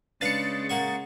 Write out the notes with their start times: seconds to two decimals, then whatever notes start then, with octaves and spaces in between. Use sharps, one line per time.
0.21 C#3 G#3 D4 B4 F5 A6 C#7
0.70 A#3 F#5 C#6